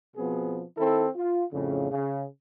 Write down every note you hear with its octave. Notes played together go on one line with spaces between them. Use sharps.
B2 F3 B3 C4 G#4
D#3 C4 E4 A4
F4
F2 A2 C#3
C#3